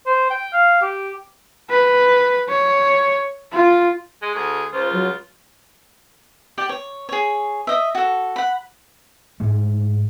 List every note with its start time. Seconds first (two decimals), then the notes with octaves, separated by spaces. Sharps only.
0.06 C5
0.30 G5
0.53 F5
0.82 G4
1.70 B4
2.49 C#5
3.52 F4
4.22 G#3
4.35 D2 G#4
4.73 C#2 F4 C5
4.93 F#3
6.58 G4 D5 G5
6.69 C#5
7.09 G#4 C#5
7.67 D#5 E5
7.95 F#4 A4
8.36 F#5 B5
9.40 G#2 G#3 A3